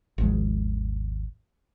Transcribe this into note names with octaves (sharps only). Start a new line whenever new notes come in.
G#1 D#2 F3 G#3